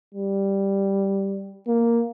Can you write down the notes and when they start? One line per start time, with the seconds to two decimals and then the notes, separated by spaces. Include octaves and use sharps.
0.15 G3
1.68 A#3